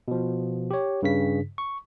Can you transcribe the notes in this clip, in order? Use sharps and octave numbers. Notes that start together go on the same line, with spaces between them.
B2 F3
G4 C#5
G2 C#3 B6
C#6